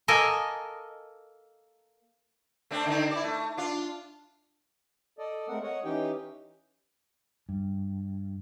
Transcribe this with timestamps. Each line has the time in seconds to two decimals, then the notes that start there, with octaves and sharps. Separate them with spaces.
0.08 A#3 A4 A#4 D#5 G#5
2.71 A3 C4 D4
2.86 D3 C4 D#4
3.11 E4 D5
3.24 A3
3.57 D4 F4
5.18 A4 D5 D#5
5.49 G#3 A3 C4 A#4 F#5
5.63 C#5 D#5 F#5
5.85 E3 C#4 D#4 G4 G5
7.49 G2